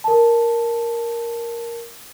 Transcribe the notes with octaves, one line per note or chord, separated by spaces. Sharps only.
A#4 A5